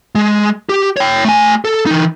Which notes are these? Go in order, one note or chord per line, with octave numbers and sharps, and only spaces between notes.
G#3
G4
C#5 G5
A3 G#5
A4
E3 D#4